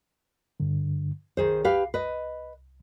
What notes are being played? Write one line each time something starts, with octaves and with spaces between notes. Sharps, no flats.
G2 D3
C2 D#3 G#4 C5
G4 B4 F5
B4 D#5